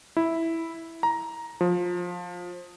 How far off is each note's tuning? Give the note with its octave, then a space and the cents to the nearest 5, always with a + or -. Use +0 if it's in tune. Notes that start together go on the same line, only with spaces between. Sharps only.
E4 -5
A#5 +10
F3 +20